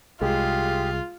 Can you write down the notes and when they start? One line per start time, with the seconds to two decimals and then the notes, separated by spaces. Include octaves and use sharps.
0.21 C2 G#3 F4 G4 G#4